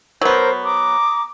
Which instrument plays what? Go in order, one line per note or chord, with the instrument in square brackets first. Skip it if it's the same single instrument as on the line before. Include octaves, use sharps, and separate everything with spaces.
[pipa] F#3 B3 [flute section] A#4 C5 G6
[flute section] A#5 D6 D#6